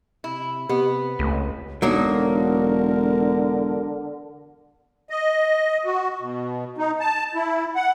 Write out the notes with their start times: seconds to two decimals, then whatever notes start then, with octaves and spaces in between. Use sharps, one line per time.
0.24 C3 E4
0.69 C3 B3 G4 D#5
1.19 C#2 A3 B6
1.82 E1 D3 F#3 A#3 D#4 A#4
5.10 D#5
5.85 F#4
6.20 B2
6.78 D#4
7.00 A5
7.35 E4
7.75 F#5